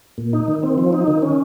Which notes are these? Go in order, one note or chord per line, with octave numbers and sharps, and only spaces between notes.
A#2
D#4
D#3
C4
F3
D#4
D#3
C#4